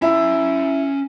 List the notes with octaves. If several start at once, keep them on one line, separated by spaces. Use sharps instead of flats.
C#4 E4 A#5